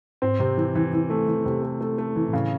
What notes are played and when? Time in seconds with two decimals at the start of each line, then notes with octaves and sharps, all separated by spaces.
0.22 G#2 C4
0.40 C3
0.57 E3
0.75 E3
0.93 E3
1.10 A3
1.28 E3
1.45 C3
1.62 A3
1.81 A3
1.98 A3
2.16 E3
2.27 A2
2.33 C#3